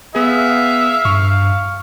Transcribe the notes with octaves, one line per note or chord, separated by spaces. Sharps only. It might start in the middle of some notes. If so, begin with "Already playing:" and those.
B3 G#4 E5 F5
G2 C#6